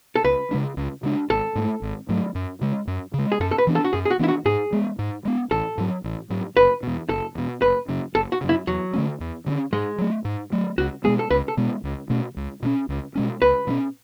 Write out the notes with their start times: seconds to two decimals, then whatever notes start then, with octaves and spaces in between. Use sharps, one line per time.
0.15 A4
0.24 C#2 B4
0.51 C#3 G#3 D4
0.77 C#2
1.03 C#3 G#3 D4
1.30 G#1 A4
1.55 G#2 F#3 A3
1.82 G#1
2.09 G#2 F#3 A3
2.35 F#2
2.61 C#3 G#3
2.87 F#2
3.14 C#3 G#3
3.32 G#4
3.40 F#2 A4
3.51 A4
3.58 B4
3.67 E3 B3 D4
3.75 A4
3.84 F#4
3.93 F#2 G#4
4.05 G#4
4.10 F#4
4.19 E3 B3 D4 E4
4.28 F#4
4.45 G#2 G#4
4.73 G#3 B3
4.99 G#2
5.25 G#3 B3
5.51 A1 A4
5.78 G#2 F#3
6.04 A1
6.30 G#2 F#3
6.57 F#1 B4
6.83 E2 B2
7.09 F#1 A4
7.35 E2 B2
7.62 F#1 B4
7.88 F#2 C#3
8.15 F#1 A4
8.32 F#4
8.41 F#2 C#3
8.49 E4
8.67 E2 F#3
8.93 D3 A3 C#4
9.20 E2
9.46 D3 A3 C#4
9.73 G#2 G#3
9.98 F#3 A3
10.25 G#2
10.52 F#3 A3
10.78 C#2 F#4
11.04 B2 G#3 B3 G#4
11.19 A4
11.30 C#2 B4
11.48 A4
11.57 B2 G#3 B3
11.84 C#2
12.10 B2 A3 C#4
12.37 C#2
12.62 B2 A3 C#4
12.89 C#2
13.15 B2 G#3 C#4
13.42 C#2 B4
13.67 B2 G#3 C#4